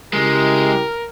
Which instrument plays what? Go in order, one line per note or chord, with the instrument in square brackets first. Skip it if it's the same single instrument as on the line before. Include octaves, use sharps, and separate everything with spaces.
[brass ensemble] C#3 E4 G4 [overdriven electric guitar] G#3 [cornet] A#4